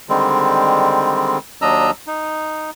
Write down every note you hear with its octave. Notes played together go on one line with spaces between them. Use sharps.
D3 D#3 G3 G#3 C4
D#2 F#3 D4 D#5 A#5 E6
D#4